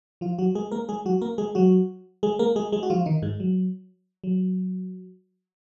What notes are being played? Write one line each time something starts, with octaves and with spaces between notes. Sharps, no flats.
F3 F4
F#3 F#4
G#3 G#4
A#3 A#4
G#3 G#4
F#3 F#4
A#3 A#4
G#3 G#4
F#3 F#4
G#3 G#4
A#3 A#4
G#3 G#4
G#3 G#4
F#4
F3 F4
D#3 D#4
G#2 G#3
F#3
F#3